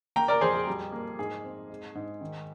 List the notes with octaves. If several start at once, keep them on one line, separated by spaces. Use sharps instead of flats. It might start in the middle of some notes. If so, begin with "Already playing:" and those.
A#3 G5 A#5
A#4 D5
F2 G#4 C5
G#4
G3
A#3
G#2 G#4
C4
G#3
G#2
D#3